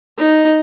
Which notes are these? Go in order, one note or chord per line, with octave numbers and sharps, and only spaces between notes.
D#4